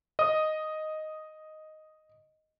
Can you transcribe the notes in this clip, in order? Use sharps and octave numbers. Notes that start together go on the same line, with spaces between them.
D#5 D#6